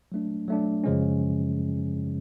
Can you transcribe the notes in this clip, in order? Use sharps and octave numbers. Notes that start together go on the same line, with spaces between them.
F#3 A3 D4
F#3 A3 D4
F#2 C#3 F3 G#3 C#4